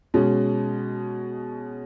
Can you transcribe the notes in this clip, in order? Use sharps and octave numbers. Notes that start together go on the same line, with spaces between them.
B2 G#3 C#4